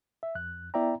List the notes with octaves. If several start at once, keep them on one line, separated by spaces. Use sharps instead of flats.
E5
F2 F#6
B3 E4 D5 E5 G5 A#5